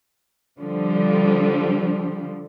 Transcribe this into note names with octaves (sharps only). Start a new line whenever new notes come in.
D3 F3 G3